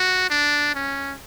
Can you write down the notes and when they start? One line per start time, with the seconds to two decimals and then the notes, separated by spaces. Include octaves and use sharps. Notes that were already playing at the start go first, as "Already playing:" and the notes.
Already playing: F#4
0.30 D4
0.75 C#4